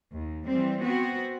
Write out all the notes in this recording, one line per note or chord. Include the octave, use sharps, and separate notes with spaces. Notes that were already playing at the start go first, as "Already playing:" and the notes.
D#2
E3 G3 C4
B3 C4 F#4